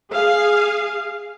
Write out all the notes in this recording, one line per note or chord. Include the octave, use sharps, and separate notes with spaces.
G#4 F5